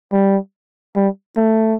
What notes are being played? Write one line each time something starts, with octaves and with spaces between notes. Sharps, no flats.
G3
G3
A3